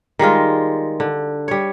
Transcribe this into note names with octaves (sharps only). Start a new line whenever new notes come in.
D#3 G3 G#3 F4
D3
G3 C#5